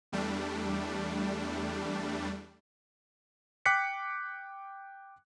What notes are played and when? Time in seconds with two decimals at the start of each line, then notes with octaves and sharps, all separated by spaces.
0.12 E2 G3 A3 D4
3.66 G5 D6 F#6 B6 C#7